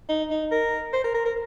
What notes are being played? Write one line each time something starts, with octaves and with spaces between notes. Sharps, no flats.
D#4
D#4
A#4
C5
A#4
A#4
A#4